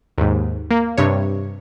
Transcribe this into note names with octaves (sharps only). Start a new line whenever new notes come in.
D#2 G#2
A#3
G2 C3 C#5